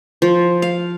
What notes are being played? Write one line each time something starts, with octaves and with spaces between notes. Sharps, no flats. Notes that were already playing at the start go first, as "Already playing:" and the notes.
F3
F5